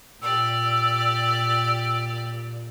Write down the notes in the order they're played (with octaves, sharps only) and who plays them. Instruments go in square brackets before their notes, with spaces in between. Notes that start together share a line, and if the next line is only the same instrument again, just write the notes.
[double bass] A#2 [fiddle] G4 D5 [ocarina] E6